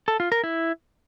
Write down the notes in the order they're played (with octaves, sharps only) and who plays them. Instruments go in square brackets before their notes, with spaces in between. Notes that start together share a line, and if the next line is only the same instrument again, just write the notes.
[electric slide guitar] A4
F4
A#4
E4